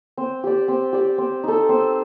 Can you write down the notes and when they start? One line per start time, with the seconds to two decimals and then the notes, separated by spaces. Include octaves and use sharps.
0.17 C4
0.44 G4 D5
0.68 C4
0.93 G4 D5
1.18 C4
1.44 D#4 A4
1.69 C4